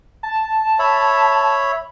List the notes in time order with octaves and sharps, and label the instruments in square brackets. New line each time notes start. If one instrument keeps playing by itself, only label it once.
[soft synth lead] A5
[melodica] C#5 E5 B5